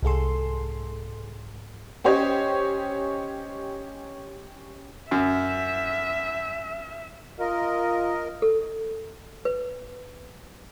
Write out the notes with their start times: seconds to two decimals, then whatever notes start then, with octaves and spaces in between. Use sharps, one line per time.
0.03 C2 G#2 G#4 A4 C6
2.04 C#4 G4 C5 C#5 D#5
5.11 F#2 E5
7.39 F4 A#4 D#5
8.42 A4
9.45 B4